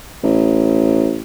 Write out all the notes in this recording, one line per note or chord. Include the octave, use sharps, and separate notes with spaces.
A1